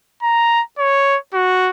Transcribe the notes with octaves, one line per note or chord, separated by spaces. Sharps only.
A#5
C#5
F#4